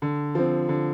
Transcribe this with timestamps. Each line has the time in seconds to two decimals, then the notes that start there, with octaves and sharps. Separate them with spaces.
0.02 D3
0.35 F3 C4
0.69 D3